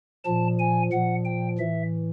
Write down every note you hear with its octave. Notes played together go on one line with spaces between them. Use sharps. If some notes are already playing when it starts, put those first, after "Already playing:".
A#2 F3 A5
G#5
A#2 F3 F#5
G5
A2 E3 E5